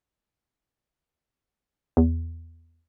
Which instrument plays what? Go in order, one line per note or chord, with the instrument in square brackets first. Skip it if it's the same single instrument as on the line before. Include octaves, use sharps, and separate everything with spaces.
[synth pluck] E2